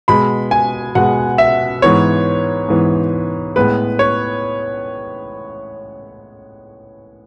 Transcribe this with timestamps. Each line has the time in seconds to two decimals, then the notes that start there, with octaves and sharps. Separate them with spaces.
0.08 B2 G#3 B3 B5
0.51 G#5
0.95 B2 G#3 B3 F#5
1.38 E5
1.82 G#2 E3 B3 C#5
2.69 G#2 E3 B3
3.56 A2 G#3 B3 B4
3.99 C#5